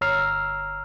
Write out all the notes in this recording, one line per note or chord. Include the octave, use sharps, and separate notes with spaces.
G1 C#5 A#5 E6 F6 C7